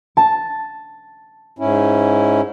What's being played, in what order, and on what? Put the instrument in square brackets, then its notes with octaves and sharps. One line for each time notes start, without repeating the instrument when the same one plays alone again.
[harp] A5
[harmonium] G#2 C#4 E4